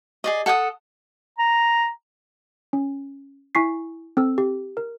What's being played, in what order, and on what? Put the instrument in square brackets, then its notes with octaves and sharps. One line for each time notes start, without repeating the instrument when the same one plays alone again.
[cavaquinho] G#4 D5 D#5
A4 F#5 G5 D#6
[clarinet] A#5
[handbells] C#4
E4 G#5 C#6 B6 C7
C4 A4 E6
G4
A#4